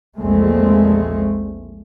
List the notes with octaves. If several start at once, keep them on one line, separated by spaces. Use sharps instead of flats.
A#1 E2 A#2 G#3 A3 C4